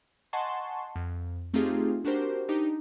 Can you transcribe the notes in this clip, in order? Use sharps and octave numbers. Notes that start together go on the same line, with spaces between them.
D#5 F#5 G#5 A5 C6 C#6
F2
A3 C4 D#4 F4 G4 G#4
D4 F#4 G4 A#4 C5
D4 D#4 G4